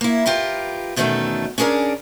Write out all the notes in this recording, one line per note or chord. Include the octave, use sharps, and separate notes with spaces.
A#3 E4
F4 G4 A#4 B4
E2 B2 D#3 A3 C#4 A4
C#4 D4 G#4 A#4 D5